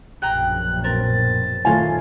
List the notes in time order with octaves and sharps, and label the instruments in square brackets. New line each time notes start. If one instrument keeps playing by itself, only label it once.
[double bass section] A#1 F#2 B2 [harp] G#4 G5 A#5 [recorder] F#6
[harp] C4 A#4 [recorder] A6
[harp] D#1 F5 C6 [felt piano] A3 F4 G#5